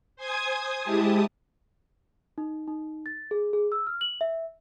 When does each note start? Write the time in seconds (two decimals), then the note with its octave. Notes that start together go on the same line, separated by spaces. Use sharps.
0.16 C5 G#5 D#6 G#6
0.82 G#3 E4 G4 A5 D#6
2.38 D#4
2.68 D#4
3.06 A6
3.31 G#4
3.53 G#4
3.72 E6
3.87 F6
4.01 F#7
4.21 E5